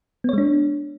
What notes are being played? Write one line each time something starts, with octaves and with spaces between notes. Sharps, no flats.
G#3 B3 D4 C#5